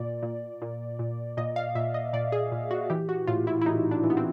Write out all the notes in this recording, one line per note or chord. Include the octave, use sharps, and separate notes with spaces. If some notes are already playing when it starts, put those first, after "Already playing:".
Already playing: A#2 D5
A#2
A#2
A#2
A#2 D#5
F5
A#2 E5
D#5
A#2 D5
G#4
A#2
F#4
E3 G4
F#4
A2 F4
E4
E4
A2 D#4
D4
E3
B3
C4